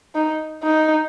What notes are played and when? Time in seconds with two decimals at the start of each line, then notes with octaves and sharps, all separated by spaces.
0.15 D#4
0.63 D#4